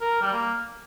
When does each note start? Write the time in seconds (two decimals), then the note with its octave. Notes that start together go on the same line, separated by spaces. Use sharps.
0.01 A#4
0.21 G3
0.32 A#3